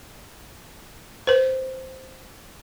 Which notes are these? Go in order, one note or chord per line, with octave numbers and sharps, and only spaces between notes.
B4 C5